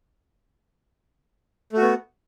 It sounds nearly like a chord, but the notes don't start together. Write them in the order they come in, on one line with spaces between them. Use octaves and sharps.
A3 F#4 B3